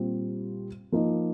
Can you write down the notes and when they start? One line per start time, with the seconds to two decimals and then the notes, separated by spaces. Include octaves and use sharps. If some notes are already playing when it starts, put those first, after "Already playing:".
Already playing: A#2 G3 C4 F4
0.92 F3 A#3 D#4